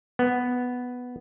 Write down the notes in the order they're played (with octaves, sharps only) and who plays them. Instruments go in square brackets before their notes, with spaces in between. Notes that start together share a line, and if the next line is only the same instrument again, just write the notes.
[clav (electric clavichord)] B3